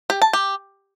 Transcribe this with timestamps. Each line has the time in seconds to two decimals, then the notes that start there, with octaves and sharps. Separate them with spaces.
0.10 G4
0.22 A5
0.33 G4